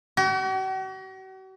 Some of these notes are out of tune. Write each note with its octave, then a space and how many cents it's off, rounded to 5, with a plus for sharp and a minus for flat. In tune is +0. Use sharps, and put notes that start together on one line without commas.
F#4 +45